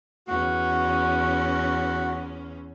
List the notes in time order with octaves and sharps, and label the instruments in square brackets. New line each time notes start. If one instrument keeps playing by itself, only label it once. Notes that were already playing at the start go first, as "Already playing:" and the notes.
[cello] E2 C#4 [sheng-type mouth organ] F#4